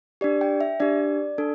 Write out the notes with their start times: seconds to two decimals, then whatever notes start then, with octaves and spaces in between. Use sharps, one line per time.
0.21 D4 G4 D5
0.41 G5
0.61 E5
0.80 D4 G4 D5
1.38 D4 A4